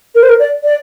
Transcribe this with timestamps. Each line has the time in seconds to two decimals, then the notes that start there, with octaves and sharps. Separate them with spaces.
0.15 A#4
0.23 C5
0.29 A#4
0.39 D5
0.63 D5